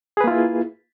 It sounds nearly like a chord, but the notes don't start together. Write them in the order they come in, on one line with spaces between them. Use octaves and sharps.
G#4 B4 A#3 F4 E4